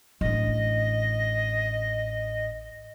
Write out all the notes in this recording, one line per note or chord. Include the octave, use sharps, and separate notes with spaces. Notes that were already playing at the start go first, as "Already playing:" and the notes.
A1 D4 D#5